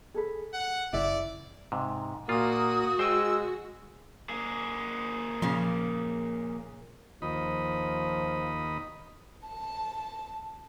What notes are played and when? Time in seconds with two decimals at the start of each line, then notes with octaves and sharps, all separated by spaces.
0.14 G#4 A4 B4
0.54 F#5
0.93 F#1 C#3 E4 D5 E5
1.72 G#2 C3
2.29 A#2 A#3 F4 F#4 D#6
2.99 G#3 C5 G5 G#5 E6
4.29 A#3 G#4
5.42 A#2 C#3 F3
7.22 D#2 F3 D#5 B5
9.47 A5